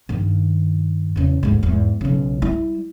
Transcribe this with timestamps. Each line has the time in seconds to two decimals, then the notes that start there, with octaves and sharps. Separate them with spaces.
0.09 G2 D#3
1.16 E2 C#3
1.43 D2 G#2
1.63 E2 G#2
2.01 B1 C#3
2.42 G3 E4